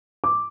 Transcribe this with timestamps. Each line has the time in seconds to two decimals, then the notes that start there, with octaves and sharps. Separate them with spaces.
0.24 D6